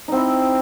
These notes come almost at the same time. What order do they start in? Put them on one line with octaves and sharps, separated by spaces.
D#4 C4 E4